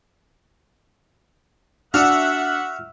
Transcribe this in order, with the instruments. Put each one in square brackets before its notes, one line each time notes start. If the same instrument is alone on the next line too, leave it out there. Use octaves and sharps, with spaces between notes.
[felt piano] D4 [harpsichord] F#4 [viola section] E5 F#5 [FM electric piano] E6 F6